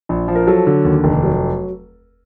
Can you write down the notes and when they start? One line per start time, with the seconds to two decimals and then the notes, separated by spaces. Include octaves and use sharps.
0.09 A#1
0.28 F3
0.35 A#4
0.47 F#3 A4
0.67 D3
0.85 D#2
1.04 F1
1.23 F#3